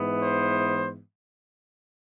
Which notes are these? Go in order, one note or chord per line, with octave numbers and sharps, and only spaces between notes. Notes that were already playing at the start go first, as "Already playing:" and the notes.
Already playing: G#2 E3 B3
C5